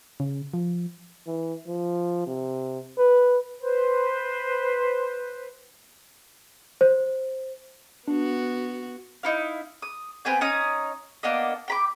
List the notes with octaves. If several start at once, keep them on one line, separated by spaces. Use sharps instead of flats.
C#3
F3
E3
F3
C3
B4
B4 C5
C5
B3 D4 F#4
D#4 E4 F5
D#6
B3 C4 G#5 G6
C#4 D#4 D#6
A#3 B3 D4 D#5
G5 B5 D6